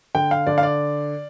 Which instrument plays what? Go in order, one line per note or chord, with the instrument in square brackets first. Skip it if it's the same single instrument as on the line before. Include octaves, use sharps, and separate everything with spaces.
[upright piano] D3 G5
F5
D3 D5
F5
D5